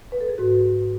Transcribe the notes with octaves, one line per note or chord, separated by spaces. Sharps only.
B4
A4
G#4
G#2 F#4